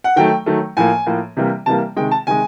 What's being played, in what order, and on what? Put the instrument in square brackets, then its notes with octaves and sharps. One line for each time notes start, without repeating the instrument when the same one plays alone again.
[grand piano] F#5
D#3 F#3 A3 G5
D#3 F#3 A3
A2 F3 A#3 G#5
A2 F3 A#3
C3 E3 G3 A#3
C3 E3 G3 A#3 A5
C3 D#3 G#3 G5
A5
C3 D#3 G#3 G#5